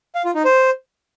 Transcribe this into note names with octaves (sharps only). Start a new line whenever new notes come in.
F5
F4
D#4
C5